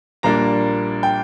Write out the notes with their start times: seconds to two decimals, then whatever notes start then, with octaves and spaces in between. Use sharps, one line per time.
0.23 A#1 A#2 G3 A#3 D4 A#5
1.03 G5